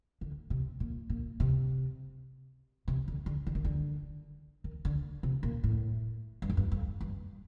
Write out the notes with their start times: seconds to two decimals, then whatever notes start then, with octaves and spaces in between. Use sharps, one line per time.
0.21 D3
0.50 C3
0.80 A#2
1.10 A#2
1.40 C3
2.88 C3
3.08 D3
3.26 D3
3.47 D3
3.55 D#3
3.65 D3
4.64 D#3
4.85 D3
5.23 C3
5.43 A#2
5.64 A2
6.42 G2
6.50 F2
6.57 G2
6.72 F2
7.01 G2